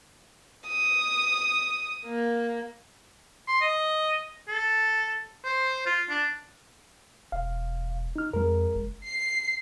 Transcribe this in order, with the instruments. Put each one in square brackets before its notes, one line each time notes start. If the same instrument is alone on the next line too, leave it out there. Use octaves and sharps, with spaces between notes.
[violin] D#6
A#3
[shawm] C6
D#5
A4
C5
F4
D4
[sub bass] E1 [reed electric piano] F5
[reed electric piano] D#4 F6
[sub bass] F2 [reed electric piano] G#3 A#4
[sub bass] F#1
[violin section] C7